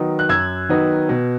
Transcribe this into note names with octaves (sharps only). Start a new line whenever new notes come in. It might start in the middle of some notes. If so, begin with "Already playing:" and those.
Already playing: D#3 F#3 B3 D#4
F#6
F#2 E6 G#6
D#3 F#3 B3 D#4
B2